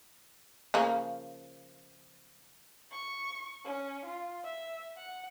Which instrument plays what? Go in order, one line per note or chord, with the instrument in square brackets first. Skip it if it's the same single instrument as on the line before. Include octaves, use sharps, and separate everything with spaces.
[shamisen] C#3 F3 A#3
[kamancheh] C#6
C#4
F4
E5
F#5